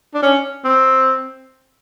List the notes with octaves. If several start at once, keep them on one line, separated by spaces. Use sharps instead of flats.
D4
C#4
C4